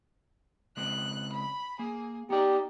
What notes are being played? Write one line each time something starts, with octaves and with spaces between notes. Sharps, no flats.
C#3 G#3 C4 F#6
B5
A#3 G#4
B3 D#4 G4 D5